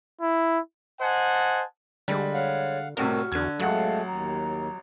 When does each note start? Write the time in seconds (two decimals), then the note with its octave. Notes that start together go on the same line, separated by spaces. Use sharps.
0.21 E4
1.01 C5 D#5 F#5 G#5 A5
2.08 D3 G3 G#3
2.34 C#5 F5 F#5
2.97 C2 A2 C3 F#4 A#4 F6
3.32 E2 D3 G#6
3.60 A1 F#3 G#3 A3 A4 F5 F#5
4.07 D#2 A#5